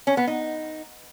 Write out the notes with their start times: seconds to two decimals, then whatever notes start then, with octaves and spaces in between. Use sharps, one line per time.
0.07 C#4
0.17 B3
0.27 D#4